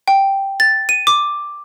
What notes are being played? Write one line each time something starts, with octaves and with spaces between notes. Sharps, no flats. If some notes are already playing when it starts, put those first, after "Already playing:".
G5
A6
D#7
D6